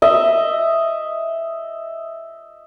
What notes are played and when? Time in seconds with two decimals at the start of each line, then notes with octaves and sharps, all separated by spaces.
0.02 D#5 E5